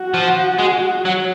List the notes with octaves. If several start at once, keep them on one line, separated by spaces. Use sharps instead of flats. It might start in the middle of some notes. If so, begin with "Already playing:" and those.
Already playing: F#4
F3
G#3
F#3